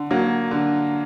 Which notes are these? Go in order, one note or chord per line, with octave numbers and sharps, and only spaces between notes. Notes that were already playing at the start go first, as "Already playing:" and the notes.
Already playing: D3
F#3 A#3
D3